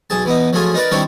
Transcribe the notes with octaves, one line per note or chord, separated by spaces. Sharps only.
B1 G#4 A5
E3 B3 D#4
F3 F#3 A3 F4 G#4
D#4 A#4 B4 D5
D#3 G3 C4 D4 E4 C#5